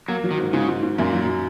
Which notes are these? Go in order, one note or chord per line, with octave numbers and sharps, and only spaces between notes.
F#3 A#3
F#3
D#3
G#2
G#2 C#3
G#2
G#2
F#2 A#2
F#3